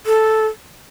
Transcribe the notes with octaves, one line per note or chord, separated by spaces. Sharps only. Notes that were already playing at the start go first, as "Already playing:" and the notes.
A4